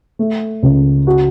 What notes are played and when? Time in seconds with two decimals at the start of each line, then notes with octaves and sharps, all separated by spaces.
0.19 A3
0.63 C#2
1.07 F#4